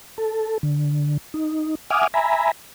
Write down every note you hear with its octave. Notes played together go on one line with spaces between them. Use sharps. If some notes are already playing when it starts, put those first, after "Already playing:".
A4
D3
D#4
E5 F#5 G#5 D6 D#6 F6
E5 G#5 A#5 B5